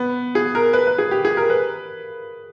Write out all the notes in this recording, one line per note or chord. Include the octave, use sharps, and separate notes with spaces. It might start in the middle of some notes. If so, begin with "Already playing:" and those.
Already playing: B3
G#4
A#4
B4
B4
G#4
G4
G#4
A#4
B4